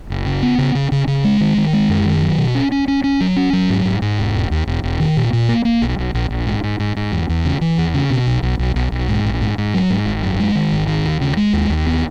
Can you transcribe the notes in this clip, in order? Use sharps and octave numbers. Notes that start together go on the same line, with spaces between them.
F#1
C#3
B3
C#3
C#3
C#3
C#3
G#3
D#3
D#3
G#3
F#2
D#3
F#3
B2
C#4
C#4
C#4
C#4
F#3
C#4
F#3
G#2
G#2
G#2
E1
E1
D#2
E1
E1
D#3
A#2
A#2
A#3
A#3
B1
B1
A#1
A#1
G#2
G#2
G#2
G#2
E2
E2
C#3
E3
E2
C#3
B2
B1
B1
B1
B1
B1
G#2
A#1
G#2
G#2
F#3
G#2
G#1
F#2
G#3
D#3
G#1
D#3
D#2
C#3
G#3
D#2
D#2
B3